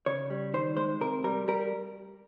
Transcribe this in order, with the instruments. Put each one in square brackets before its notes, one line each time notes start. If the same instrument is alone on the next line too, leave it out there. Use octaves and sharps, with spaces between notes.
[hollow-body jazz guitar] C#3 C#5
G3
D#3 C5
G#3 C5
C3 A#4
G3 A#4
G3 A#4